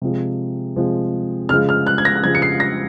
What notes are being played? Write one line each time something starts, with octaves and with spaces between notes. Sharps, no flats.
C3 F3 G#3
C3 F3 G#3
C#3 F3 G#3 F6
F6
F#6
G#6
A#6
F#6
C#3 F3 G#3 G#6
C#7
C7
A#6